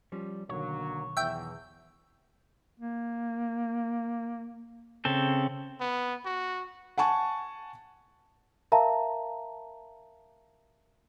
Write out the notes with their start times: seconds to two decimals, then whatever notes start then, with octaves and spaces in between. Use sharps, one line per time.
0.12 F3 G3 C#4
0.49 B1 D3 D#3 F#3 A#3 C#5
1.17 E2 E5 G5
2.80 A#3
5.05 C#3 C4 A4
5.80 B3
6.26 F#4
6.98 F#5 G#5 A5 C#6
8.72 A#4 E5 F5 A5 A#5